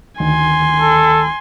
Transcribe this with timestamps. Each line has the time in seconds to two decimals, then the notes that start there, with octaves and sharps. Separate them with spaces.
0.20 D2 D#3 G#5 C6
0.80 A4